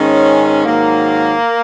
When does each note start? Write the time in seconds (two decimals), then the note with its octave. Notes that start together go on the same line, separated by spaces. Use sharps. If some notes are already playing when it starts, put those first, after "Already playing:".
Already playing: G#2 D#3 G#3 C#4
0.65 G#2 D#3 F#3 A#3